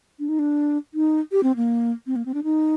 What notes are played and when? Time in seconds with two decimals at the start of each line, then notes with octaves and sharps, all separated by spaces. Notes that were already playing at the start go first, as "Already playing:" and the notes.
0.19 D4
0.29 D#4
0.39 D4
0.94 D#4
1.32 G4
1.43 C4
1.56 A#3
2.07 C4
2.16 A#3
2.26 C4
2.34 D4
2.44 D#4